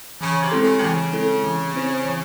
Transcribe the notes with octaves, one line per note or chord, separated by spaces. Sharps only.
C#3 E3
C3
G#3 C4 E4 A4
C#3
C3
C#3 E3
G#3 C4 E4 A4
E3
C4 E4 C5
E3